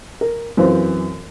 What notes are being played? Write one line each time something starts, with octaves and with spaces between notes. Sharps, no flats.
A#4
F#2 E3 C4 F4